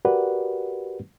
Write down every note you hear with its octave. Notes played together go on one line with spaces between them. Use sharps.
F#4 G4 A#4 B4 D5 F#5